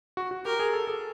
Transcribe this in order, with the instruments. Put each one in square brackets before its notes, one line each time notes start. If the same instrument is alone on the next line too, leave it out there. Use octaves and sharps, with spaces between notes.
[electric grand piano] F#4
F#4
[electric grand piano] G4 [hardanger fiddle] A#4
[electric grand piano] G#4
A4
A4